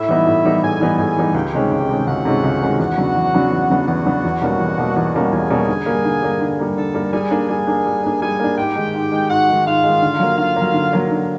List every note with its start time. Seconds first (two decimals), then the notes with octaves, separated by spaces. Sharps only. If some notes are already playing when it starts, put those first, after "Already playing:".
Already playing: A2 E4 E5
0.08 E3 G3 B3 D#4
0.26 A2
0.45 E3 G3 B3 D#4
0.63 A2 G#4 G#5
0.80 E3 G3 B3 D#4
0.98 A2 G#4 G#5
1.17 E3 G3 B3 D#4
1.34 C#2 G4 G5
1.53 C3 D#3 G#3 C#4
1.71 C#2
1.89 C3 D#3 G#3 C#4
2.07 C#2 F#4 F#5
2.25 C3 D#3 G#3 C#4
2.43 C#2
2.61 C3 D#3 G#3 C#4
2.79 E2 F#4 F#5
2.97 C#3 F#3 B3 D4
3.15 E2
3.34 C#3 F#3 B3 D4
3.52 E2
3.70 C#3 F#3 B3 D4
3.87 E2 F#4 F#5
4.06 C#3 F#3 B3 D4
4.24 E2
4.41 B2 G3 A#3 C#4
4.60 E2
4.78 B2 G3 A#3 C#4
4.96 E2
5.15 B2 G3 A#3 C#4
5.32 E2 G#4 G#5
5.50 B2 G3 A#3 C#4
5.68 D3
5.86 G3 A#3
6.05 D3
6.22 G3 A#3
6.41 D3
6.59 G3 A#3
6.77 D3 A4 A5
6.95 G3 A#3
7.12 G3 G#4 G#5
7.31 A#3 D4
7.49 G3 G#4 G#5
7.67 A#3 D4
7.86 G3
8.04 A#3 D4
8.21 G3 G#4 G#5
8.40 A#3 D4
8.58 G#2 G4 G5
8.76 D#3 G#3
8.94 G#2
9.12 D#3 G#3
9.30 G#2 F#4 F#5
9.48 D#3 G#3
9.65 G#2 F4 F5
9.83 D#3 G#3
10.02 D3
10.20 F#3 A#3
10.38 D3 F4 F5
10.56 F#3 A#3
10.74 D3
10.93 F#3 A#3
11.11 D3